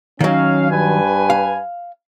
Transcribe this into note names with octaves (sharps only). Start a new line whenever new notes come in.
D#3 F#3 C#4 F5
G2 B4 G#5
F5